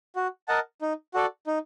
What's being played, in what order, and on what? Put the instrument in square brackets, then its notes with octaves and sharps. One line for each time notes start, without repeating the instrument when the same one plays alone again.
[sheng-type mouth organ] F#4
A#4 D#5 F#5 A5
D#4
F#4 A4 D5
D#4